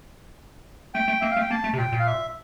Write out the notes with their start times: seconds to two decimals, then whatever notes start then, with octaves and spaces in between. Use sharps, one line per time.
0.94 A3 G5
1.08 A3
1.21 A#3 E5
1.31 F5
1.37 A3
1.41 G5
1.51 A#3 A5
1.64 A3
1.73 C3
1.78 A#2 G5
1.92 A#2
1.99 F5
2.07 E5